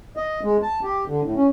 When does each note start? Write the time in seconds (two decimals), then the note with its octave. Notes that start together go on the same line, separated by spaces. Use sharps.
0.17 D#5
0.44 G#3
0.63 A5
0.83 G4
1.08 D3
1.24 A2
1.37 C#4